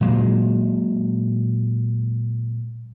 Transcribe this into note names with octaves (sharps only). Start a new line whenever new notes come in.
A#2 F#3 G#3